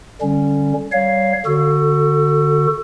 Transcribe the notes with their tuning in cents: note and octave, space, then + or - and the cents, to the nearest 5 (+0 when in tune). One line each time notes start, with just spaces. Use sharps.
D3 +0 G3 +0 C#4 +0
G3 -20 C#5 +0 F5 +0
D3 +0 F#4 +0 A4 +25